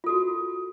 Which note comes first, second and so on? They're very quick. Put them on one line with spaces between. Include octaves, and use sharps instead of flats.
F4 A4 F#4